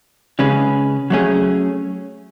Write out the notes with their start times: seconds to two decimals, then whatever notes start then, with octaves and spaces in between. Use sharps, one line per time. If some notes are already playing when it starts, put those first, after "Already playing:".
0.39 C#3 G#3 C#4 G#4 B4
1.10 F#3 A3 C#4 G#4